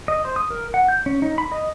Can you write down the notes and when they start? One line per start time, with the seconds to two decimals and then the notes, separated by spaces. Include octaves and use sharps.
0.08 D#5
0.25 C5
0.36 D#6
0.50 A#4
0.74 F#5
0.88 G6
1.06 C#4
1.22 D#4
1.38 B5
1.52 D#5